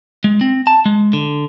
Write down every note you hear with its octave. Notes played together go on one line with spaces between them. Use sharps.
G#3
C4
A5
G#3
D3